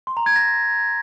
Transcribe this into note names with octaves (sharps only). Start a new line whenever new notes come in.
C6
A#5
G#6
A#6